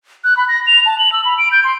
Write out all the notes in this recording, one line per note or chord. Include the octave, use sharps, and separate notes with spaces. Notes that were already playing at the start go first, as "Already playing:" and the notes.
F#6
B5
A#6
F7
A5
F#7
E6
B5
D7
G6
C6